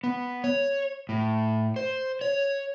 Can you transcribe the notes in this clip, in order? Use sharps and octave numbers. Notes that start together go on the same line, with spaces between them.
B3
C#5
A2
C5
C#5